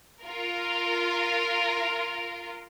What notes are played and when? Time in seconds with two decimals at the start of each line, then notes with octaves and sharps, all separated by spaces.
0.21 F4 A#4